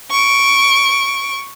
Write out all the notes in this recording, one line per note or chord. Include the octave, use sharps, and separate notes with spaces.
C#6 D7